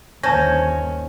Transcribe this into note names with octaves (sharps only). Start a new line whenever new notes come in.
G1 D#2 C#4 C5 A5 G6 G#6 A#6